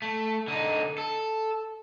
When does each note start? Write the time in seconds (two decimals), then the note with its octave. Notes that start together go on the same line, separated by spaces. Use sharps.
0.02 A3
0.48 D3 D#4
0.98 A4